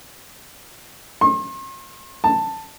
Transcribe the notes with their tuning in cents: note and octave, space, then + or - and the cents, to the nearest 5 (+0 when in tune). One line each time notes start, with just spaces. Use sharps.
C6 +45
A5 +10